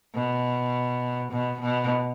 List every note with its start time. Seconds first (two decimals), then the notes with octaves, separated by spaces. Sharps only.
0.14 B2
1.32 B2
1.61 B2